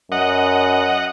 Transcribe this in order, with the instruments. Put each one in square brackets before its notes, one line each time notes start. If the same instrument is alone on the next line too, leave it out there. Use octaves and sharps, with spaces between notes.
[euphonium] F#2 [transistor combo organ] D#5 F#5